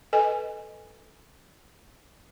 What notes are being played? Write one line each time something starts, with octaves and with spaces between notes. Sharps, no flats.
A4 B4 D#5 G#5